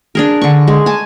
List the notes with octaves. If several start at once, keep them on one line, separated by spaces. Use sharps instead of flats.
D4 G#4 A#4
D3 C#6
G#3
G#5 A5